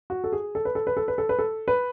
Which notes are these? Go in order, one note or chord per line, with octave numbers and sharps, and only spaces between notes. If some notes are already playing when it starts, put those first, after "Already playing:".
F#4
A4
G#4
A4
B4
A4
B4
A4
B4
A4
B4
A4
B4